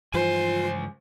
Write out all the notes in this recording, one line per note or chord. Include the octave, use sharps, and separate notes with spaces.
C#2 G2 E3 F3 F4 C5 G#5